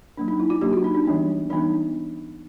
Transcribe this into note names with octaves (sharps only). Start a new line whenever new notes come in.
F#3 A#3 D4
D#4
E4
F4
F#3 A#3 D4 G4
F#4
D#4
D4
E3 G3 B3 D4
E3 G3 B3 D4 D#4